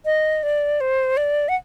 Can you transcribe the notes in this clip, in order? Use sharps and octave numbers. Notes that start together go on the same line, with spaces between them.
D#5
D5
C5
D5
F#5